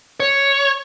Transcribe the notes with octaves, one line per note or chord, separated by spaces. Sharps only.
C#5